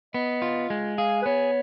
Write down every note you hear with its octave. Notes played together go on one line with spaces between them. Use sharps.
B3 D#5
F4
G#3
G#4 F5
B4
B3 C#5